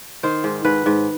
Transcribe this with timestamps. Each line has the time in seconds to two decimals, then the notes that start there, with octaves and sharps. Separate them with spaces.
0.23 D#3 C5
0.44 G#2
0.65 G#2 B4
0.86 G#2